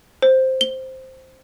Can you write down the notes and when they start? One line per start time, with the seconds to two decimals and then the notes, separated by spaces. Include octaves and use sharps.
0.22 C5
0.61 G7